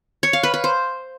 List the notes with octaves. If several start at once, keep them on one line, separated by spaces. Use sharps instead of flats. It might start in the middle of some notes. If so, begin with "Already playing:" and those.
C#5
F5
B4
B4
C5